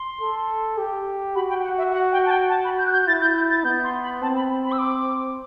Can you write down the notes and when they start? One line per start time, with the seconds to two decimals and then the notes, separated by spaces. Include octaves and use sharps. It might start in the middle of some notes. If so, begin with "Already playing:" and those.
Already playing: C6
0.21 A4
0.78 G4
1.35 F#4 B5
1.49 G5
1.64 F#5
1.78 E5
1.92 F#5
2.12 G5
2.26 A5
2.31 G5
2.49 A5
2.65 B5
2.78 G6
2.86 F#6
2.93 G6
3.07 E4 A6
3.21 G6
3.36 G6
3.50 A6
3.64 B3 G6
3.84 C6
4.02 B5
4.22 C4 A5
4.36 B5
4.65 B5
4.72 E6
4.79 D6